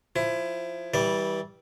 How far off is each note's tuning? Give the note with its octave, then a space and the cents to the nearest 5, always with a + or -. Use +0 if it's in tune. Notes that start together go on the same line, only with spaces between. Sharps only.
F3 +5 E4 +20
E3 -25 G3 +0 D5 +0